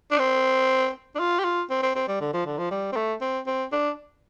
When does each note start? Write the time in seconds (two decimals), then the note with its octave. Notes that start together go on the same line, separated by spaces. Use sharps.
0.11 D4
0.18 C4
1.15 D4
1.19 F4
1.39 G4
1.44 F4
1.70 C4
1.83 C4
1.95 C4
2.08 G3
2.21 D3
2.33 F3
2.46 D3
2.58 F3
2.71 G3
2.92 C4
2.96 A3
3.21 C4
3.47 C4
3.72 D4